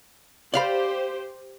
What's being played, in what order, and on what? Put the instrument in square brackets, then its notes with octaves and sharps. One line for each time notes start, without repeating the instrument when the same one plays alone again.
[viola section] G4 C5 [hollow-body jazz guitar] D5 F5 B5